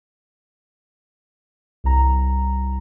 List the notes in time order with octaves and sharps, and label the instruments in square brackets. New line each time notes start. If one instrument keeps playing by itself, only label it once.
[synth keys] C2 A#5